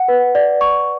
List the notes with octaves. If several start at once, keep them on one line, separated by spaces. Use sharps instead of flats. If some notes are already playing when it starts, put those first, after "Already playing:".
Already playing: F#5
B4
D5
C#6